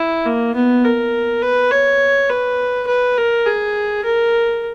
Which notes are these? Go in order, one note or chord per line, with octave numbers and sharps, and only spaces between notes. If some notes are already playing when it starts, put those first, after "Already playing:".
Already playing: E4
A#3
B3
A#4
B4
C#5
B4
B4
A#4
G#4
A#4